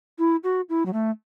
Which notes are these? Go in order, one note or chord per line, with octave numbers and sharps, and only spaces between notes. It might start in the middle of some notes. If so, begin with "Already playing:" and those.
E4
F#4
E4
F#3
A3